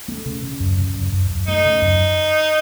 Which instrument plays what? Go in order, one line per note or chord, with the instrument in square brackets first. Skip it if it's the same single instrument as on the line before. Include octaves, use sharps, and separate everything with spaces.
[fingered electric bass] A3
C#3
C#3
F#2
C#3
F#2
F#2
F#2
[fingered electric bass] A3 [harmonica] D#4
[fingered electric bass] C#3
F#2